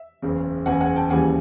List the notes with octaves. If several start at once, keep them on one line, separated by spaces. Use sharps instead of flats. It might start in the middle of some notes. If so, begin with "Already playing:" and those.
Already playing: E5
F#1 E2 C#3
F#1 E2 C#3 F#5 G#5
F#5 G#5
G5 A5
D#2 C#3 E3 G3 F#5 G#5